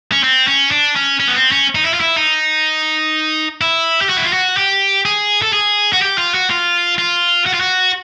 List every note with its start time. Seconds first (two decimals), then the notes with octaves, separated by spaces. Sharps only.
0.12 C#4
0.23 C4
0.47 C#4
0.71 D4
0.96 C#4
1.20 C#4
1.28 B3
1.36 C4
1.52 C#4
1.75 D#4
1.84 E4
1.94 F4
2.00 E4
2.16 D#4
3.61 E4
4.01 G4
4.09 F#4
4.17 E4
4.25 F4
4.33 F#4
4.57 G4
5.05 G#4
5.42 A4
5.53 G#4
5.93 F#4
6.02 G4
6.18 F4
6.35 F#4
6.50 F4
6.98 F4
7.46 F#4
7.54 F4
7.61 F#4